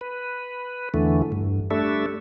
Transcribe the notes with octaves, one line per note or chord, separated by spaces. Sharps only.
B4
E2 D3 E3 A3
G2
G3 A3 D4 A4 E5